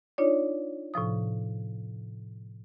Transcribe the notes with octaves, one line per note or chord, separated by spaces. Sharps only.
D4 D#4 F4 C#5 D5
A2 C3 F3 D#6